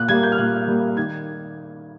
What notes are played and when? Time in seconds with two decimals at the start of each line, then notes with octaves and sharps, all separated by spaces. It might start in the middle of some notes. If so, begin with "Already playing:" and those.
Already playing: A#2 F#6
0.08 G3 A#3 G#6
0.23 G6
0.32 F6
0.38 A#2 F#6
0.67 G3 A#3
0.97 D#3 G#6